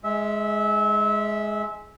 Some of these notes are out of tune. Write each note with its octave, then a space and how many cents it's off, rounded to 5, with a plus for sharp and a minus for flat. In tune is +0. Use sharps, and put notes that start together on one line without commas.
G#3 +10 E5 -20